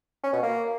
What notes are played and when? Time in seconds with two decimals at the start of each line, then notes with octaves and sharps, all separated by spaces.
0.23 C#4
0.33 B2
0.43 A#3